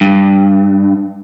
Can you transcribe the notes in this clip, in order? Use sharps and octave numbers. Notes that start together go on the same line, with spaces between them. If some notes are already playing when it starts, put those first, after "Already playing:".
G2